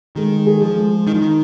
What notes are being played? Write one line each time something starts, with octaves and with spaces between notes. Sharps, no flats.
D#3 G#3
G#4
F3
G#3
D#3 D#4
F3
D#3